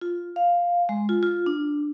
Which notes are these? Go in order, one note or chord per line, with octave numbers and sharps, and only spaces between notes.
F4
F5
G#3
F4
F4
D4